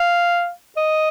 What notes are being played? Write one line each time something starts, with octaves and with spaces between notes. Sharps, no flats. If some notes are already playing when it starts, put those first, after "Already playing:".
Already playing: F5
D#5